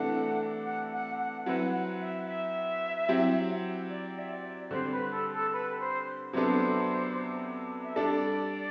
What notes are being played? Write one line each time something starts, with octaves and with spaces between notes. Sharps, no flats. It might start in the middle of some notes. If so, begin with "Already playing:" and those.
Already playing: C3 E3 A3 D4 A4 F#5
F#5
F#5
F#5
F#3 C4 E4 B4 F#5
F#5
E5
E5
F#3 C4 E4 G4
D5
E5
D5
D3 G3 C4 C5
B4
A4
A4
B4
C5
C3 F#3 B3 D4 A4 C5
E5
G3 D4 A4 D5